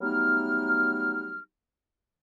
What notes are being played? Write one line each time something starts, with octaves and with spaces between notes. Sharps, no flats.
F#3 G3 A3 B3 D#4 F6